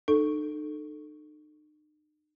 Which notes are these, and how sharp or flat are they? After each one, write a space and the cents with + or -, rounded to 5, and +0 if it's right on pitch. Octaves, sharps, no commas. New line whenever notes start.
D#4 -45 A4 +0